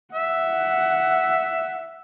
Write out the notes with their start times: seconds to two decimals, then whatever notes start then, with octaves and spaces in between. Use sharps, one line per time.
0.15 E5 F#5